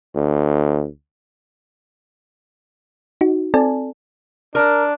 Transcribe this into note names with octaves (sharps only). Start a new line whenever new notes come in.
D2
D#4 F#4
C4 A4 D5 G#5 A5
D4 A#4